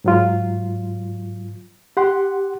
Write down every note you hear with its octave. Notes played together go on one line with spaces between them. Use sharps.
G#2 F#3 F4
G4 F#5 C6